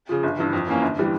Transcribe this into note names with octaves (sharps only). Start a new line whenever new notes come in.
C#3 F3
G1
G2 E3
F2
E3 A#3 C#4
G1
E3 G3